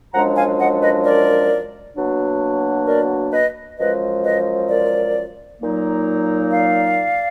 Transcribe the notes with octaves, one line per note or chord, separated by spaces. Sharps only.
F#2 F3 G#3 D4 F#5 A#5
F5 G#5
D#5 F#5
B4 D#5
A#4 D5
B2 F#3 A#3 D4
A#4 D5
B4 D#5
F#2 F3 G#3 B4 D#5
B4 D#5
A#4 D5
A#2 F#3 A#3 D#4
D5 F5